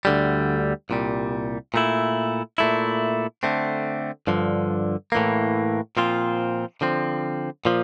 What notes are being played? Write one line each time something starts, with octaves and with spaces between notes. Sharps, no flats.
D2 D3 G3
C2 A#2 G3
A#2 A3 E4
A#2 A3 E4
D3 A3 C4
G2 D3 F3
A2 E3 A#3
A#2 F3 C4 F4
D3 F3 C4
A#2 F3